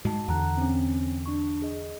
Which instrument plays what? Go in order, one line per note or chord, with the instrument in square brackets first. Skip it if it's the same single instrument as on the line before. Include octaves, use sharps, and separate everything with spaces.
[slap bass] G#2 G#3 [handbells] F#4 A5
[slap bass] E2 D3 [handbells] F#5 A#5 F#6
[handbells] C4 C#4
D4 C#6
G#4 D#5